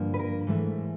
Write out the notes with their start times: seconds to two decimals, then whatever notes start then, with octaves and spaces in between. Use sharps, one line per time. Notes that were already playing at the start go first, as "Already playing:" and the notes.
Already playing: G2 D3 F3 A#3
0.14 B4
0.19 A#4
0.47 G#2 E3 A3